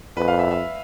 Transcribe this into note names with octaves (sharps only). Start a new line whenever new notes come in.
F2 B4
F5
E5
E5